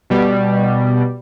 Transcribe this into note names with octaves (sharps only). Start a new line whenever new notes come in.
B2 G3